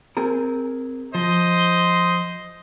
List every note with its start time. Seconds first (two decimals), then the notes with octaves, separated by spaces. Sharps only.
0.17 C4 G#4 A#4
1.15 F3 C5 D#5